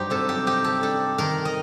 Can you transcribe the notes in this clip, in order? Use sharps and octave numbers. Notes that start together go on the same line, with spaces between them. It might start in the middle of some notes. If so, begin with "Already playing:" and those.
Already playing: G2 F#3 D#4 G4 C5
C3 A4
G4
D#4 G4
A4
D4 A4
D#3 A#4
D#5